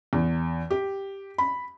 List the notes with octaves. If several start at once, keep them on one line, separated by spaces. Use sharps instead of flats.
E2
G4
B5